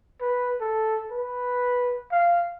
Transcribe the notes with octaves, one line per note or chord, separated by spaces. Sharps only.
B4
A4
B4
F5